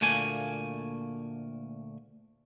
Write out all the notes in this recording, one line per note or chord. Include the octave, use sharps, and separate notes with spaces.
D2 A#2 A3 A#3 G#5